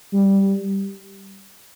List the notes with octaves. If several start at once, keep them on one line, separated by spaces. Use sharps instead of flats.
G3